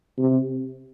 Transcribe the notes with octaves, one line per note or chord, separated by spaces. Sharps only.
C3